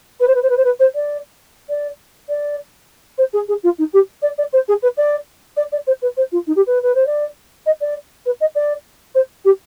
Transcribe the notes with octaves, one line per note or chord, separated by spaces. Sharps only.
B4
C5
B4
C5
B4
C5
B4
C5
D5
D5
D5
C5
G#4
G#4
F4
D#4
G4
D5
D5
C5
G#4
B4
D5
D5
D5
C5
B4
C5
F4
D#4
G4
B4
B4
C5
D5
D#5
D5
B4
D#5
D5
C5
G4